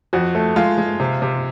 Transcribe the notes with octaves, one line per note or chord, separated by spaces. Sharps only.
F2 F#4
A3
G#3 F4
G#3
C3
C3